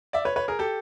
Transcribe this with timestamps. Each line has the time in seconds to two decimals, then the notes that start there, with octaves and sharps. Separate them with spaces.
0.13 D5 E5
0.25 B4 C#5
0.36 B4 C#5
0.48 G#4 A#4
0.59 G4 A4